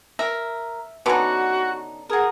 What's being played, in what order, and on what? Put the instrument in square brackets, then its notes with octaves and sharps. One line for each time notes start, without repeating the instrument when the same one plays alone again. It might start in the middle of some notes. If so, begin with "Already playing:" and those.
[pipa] A#4 [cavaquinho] E5
[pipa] D3 B3 C#4 [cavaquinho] D#4 D6 [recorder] F#4
[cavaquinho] F#4 A#4 [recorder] G#4